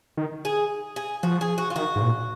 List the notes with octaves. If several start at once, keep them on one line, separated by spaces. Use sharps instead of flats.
D#3
G#4
G#4
F3 F#4
G#4
F#4
F4
D#3 F#4
G#2
A#2